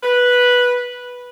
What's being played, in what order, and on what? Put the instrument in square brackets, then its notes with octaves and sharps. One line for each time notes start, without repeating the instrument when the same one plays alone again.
[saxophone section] B4